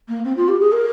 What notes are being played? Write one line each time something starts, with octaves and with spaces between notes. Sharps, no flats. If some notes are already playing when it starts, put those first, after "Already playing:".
A#3
C4
F4
G4
G#4
A#4